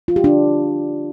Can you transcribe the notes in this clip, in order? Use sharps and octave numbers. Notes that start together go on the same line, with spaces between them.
F4
G4
D4